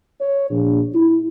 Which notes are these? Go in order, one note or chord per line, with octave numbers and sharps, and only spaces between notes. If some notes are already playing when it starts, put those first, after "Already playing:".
C#5
A#1
E4